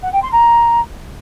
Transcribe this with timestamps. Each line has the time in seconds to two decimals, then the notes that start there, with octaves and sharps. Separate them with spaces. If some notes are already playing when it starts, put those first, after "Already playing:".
0.03 F#5
0.13 G5
0.22 C6
0.32 A#5